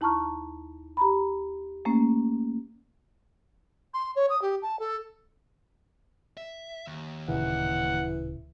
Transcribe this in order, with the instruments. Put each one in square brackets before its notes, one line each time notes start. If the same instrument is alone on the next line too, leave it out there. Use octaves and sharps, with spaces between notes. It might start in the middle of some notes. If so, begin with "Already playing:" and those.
[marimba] D#2 E4 A5 A#5 C#6 F6
G4 A#5 B5
A3 A#3 C#4
[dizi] C6
C#5
D#6
G4
A5
A4
[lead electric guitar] E5
D#2
[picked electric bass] D1 A#2 C#3 [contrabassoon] E3 [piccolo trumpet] F#5